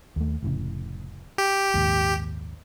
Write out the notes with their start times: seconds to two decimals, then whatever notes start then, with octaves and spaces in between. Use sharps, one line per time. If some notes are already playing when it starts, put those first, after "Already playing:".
0.16 D#2 A3
0.42 F1 A2 C#3
1.38 G4
1.74 A#1 D#2 G#2